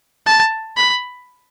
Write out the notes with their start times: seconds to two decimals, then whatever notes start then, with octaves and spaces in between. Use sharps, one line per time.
0.26 A5
0.77 B5